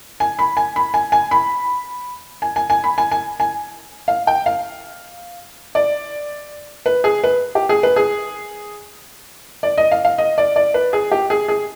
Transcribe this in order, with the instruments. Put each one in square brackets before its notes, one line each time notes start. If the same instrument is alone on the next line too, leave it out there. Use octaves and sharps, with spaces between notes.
[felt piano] G#5
B5
G#5
B5
G#5
G#5
B5
G#5
G#5
G#5
B5
G#5
G#5
G#5
F5
G5
F5
D5
B4
G#4
B4
G4
G#4
B4
G#4
D5
D#5
F5
F5
D#5
D5
D5
B4
G#4
G4
G#4
G#4